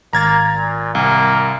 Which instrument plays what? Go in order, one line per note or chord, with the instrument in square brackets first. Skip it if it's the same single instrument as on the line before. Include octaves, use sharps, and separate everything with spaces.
[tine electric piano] G#1 [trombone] A#3 [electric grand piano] A#5 G#6 A6
[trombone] A#2
[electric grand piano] C2 [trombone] A#3